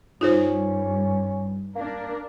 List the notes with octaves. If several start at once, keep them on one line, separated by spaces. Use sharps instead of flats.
G2 C#4 D#4 F4 G#4 C5
A#3 D4 A#4